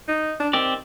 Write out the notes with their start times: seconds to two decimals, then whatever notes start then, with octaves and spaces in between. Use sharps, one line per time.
0.08 D#4
0.40 D4
0.53 D#3 C4 G4 D5